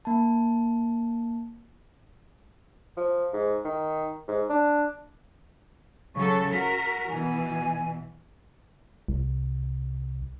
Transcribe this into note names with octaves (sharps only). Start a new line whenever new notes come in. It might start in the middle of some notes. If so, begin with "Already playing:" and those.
A#3 A5
F3
G#2
D#3
G#2
D4
C#3 F#3 A4 C#6
F#4 A#4 B6
B2 E3 G#5
C2